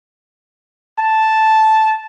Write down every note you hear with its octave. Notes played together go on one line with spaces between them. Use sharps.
A5